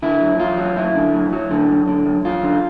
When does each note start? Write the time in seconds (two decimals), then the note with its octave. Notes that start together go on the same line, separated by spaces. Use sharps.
0.02 D3 E4
0.21 F#3
0.39 F#2 F4
0.57 F#3
0.76 F#2 E4
0.95 D3
1.14 F#2
1.33 F#3
1.51 D3
1.69 F#2
1.88 D3
2.06 F#2
2.25 F#2 F4
2.43 D3